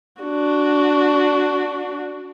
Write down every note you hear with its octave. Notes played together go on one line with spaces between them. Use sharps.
D4 F#4